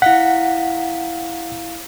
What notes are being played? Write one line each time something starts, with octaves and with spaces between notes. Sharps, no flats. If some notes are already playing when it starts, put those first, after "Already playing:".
E4 F5 F#5 B6